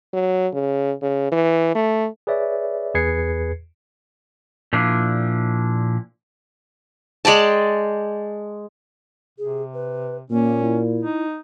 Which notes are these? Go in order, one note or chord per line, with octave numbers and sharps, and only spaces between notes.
F#3
C#3
C#3
E3
A3
G#4 B4 C#5 D5 E5
E2 G#4 B4 G#6 C7 C#7
A#2 F3 D4 E4
G#3 D5 G5 A5
C3 G#4
B4
A#2 A#3 C#4
E4
D#4